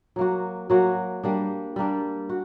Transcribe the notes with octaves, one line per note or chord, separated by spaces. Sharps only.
F#3 A#3 F#4
F#3 A#3 F#4
G3 A#3 D4
G3 A#3 D4
F#4